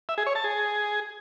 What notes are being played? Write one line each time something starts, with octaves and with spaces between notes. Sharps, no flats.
E5
G#4
C#5
A5
G#4